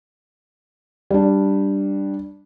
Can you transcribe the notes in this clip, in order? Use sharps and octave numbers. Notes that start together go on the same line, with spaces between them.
G3 D4